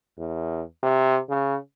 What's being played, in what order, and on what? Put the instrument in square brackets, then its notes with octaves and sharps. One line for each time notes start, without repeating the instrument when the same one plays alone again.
[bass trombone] E2
C3
C#3